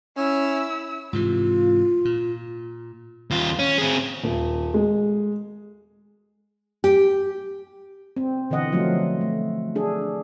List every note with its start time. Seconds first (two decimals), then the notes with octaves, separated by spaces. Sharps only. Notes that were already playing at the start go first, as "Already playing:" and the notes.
0.17 C#4 E4 E6
1.13 G#2 C3 E3 F4
2.05 A#2
3.31 D#2 F4
3.59 C#4
3.78 C4 G#4
4.23 D#1
4.74 G#3
6.84 G4
8.16 C4
8.50 B2 D3 E3 D#5 F#5
8.72 F3 F#3 A3 F4
9.21 A3
9.75 D4 G#4 A4